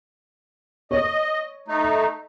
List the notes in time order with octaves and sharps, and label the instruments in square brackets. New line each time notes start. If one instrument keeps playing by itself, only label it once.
[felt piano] C#5 [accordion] D#5
[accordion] A3 D#4